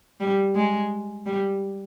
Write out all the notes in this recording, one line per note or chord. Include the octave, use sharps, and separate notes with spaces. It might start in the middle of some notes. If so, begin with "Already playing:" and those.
G3
G#3
G3